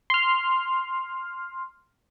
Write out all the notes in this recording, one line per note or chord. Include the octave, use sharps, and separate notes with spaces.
C6 F6